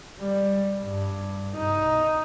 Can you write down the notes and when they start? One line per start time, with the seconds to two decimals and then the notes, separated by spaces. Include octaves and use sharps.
0.20 G3
0.80 G2
1.56 D#4